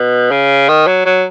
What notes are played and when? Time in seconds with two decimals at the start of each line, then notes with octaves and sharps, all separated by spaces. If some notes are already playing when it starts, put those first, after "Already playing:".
Already playing: B2
0.31 C#3
0.69 D#3
0.87 F#3
1.06 F#3